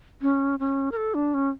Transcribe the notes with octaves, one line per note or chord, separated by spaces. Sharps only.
C#4
C#4
A#4
A4
D4
C#4